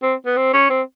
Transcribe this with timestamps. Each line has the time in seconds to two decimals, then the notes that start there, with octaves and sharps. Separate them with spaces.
0.02 C4
0.25 B3
0.37 C4
0.53 C#4
0.70 C4